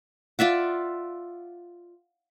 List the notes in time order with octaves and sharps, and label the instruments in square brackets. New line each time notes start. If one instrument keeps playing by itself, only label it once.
[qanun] F4 D5 E5 F#5